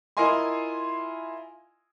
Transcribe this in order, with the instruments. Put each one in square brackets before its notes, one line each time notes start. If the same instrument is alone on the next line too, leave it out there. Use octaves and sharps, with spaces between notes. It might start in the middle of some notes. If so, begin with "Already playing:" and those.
[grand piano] E4 F4 A#4 D#5 G#5 C6